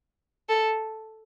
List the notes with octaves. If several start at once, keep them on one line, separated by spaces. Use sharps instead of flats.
A4